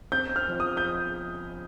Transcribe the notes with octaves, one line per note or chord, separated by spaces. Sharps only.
C4 G6
F6
F3
D#6
G6